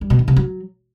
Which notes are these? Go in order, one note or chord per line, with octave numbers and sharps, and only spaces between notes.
G3
B2
D#3
C3
F#3